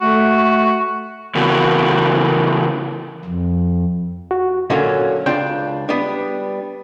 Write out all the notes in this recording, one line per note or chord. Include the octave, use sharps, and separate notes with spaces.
A3 F#4
C#3 E3 B3 F#4 A#4
F2
F#4
A#2 D3 F#3 A#3 C#4
C#2 D4 F4 D5 G5
G3 B3 D4